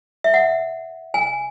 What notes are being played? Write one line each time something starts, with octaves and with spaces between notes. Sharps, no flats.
E5
F#5
G#5